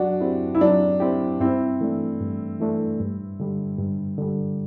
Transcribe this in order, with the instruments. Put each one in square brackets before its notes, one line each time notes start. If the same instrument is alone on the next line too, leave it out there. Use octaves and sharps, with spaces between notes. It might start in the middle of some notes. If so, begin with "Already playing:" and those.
Already playing: [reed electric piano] F#3 [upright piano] D4 F#4
[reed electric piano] C4 E4 G4
[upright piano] E4
[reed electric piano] F#3 [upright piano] D4
[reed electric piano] C4 E4 G4
[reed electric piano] G2 [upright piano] C4 E4
[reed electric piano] E3 A3 D4
G2
E3 A3 D4
G2
D3 G3
G2
D3 G3